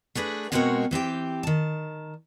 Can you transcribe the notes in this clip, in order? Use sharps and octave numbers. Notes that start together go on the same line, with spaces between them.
A3 D4 G#4 B4
B2 G#3 C4 F#4 A#4 C#5
E3 C4 G4 G5
D#3 A5